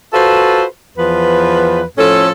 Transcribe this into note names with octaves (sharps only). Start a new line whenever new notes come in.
F4 F#4 A4 B4 C5
E2 F3 B4
A2 F3 C#4 A4